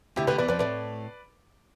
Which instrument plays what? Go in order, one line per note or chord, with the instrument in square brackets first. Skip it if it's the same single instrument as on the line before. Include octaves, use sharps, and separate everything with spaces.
[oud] D2 D3 [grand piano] E4 G4
[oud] D2 D3 [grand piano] G4 B4
[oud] E2 E3 [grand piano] B4 D5
[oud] F2 F3 [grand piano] B4 D5
[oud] A2 A3 [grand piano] B4 D5